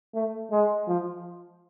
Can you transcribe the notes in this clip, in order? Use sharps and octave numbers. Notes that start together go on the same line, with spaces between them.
A3
G#3
F3